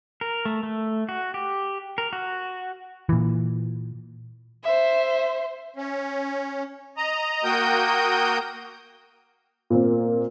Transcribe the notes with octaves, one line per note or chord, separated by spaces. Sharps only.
A#4
A3
A3
F#4
G4
A#4
F#4
A#2 E3
C5 E5
C#4
D#5 A#5
A#3 F#4 A#4 G5 D#6 G6
A#2 A#3 C4